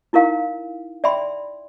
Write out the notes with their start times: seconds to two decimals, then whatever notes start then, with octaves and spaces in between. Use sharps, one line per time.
0.13 D#4 E4 A#4 F5
1.04 D5 E5 G5 B5 C6